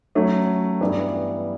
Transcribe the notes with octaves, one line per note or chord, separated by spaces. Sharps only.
F#3 A3 C#4
G2 E3 G3 B3 E4